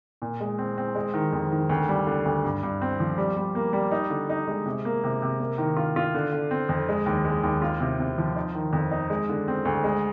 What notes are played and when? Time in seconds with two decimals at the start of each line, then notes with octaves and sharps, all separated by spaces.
0.22 A#2
0.40 G#3
0.58 C4
0.78 C4
0.95 G#3
1.14 D#3
1.33 F2
1.52 D#3
1.69 D2
1.89 G3
2.07 D3
2.25 D2
2.44 G2
2.63 G2
2.82 C4
3.00 F3
3.18 G3
3.37 G3
3.55 A#3
3.73 G3
3.91 D#4
4.10 D3
4.30 D#4
4.48 G#3
4.66 C3
4.85 A#3
5.04 C3
5.22 C3
5.40 A#3
5.58 D#3
5.76 F4
5.96 F4
6.15 D3
6.32 D3
6.51 C4
6.69 F2
6.89 G#3
7.06 D#2
7.25 G#3
7.43 D#2
7.62 F4
7.80 C3
7.99 C3
8.18 F3
8.36 D#4
8.55 D#3
8.73 F2
8.91 D#4
9.10 G#3
9.29 D3
9.48 C4
9.65 D2
9.84 G#3